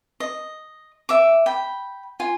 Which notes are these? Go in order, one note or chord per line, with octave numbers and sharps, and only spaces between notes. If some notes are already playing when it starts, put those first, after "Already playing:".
D#5
E5 D6
G5 B5
F4 G#5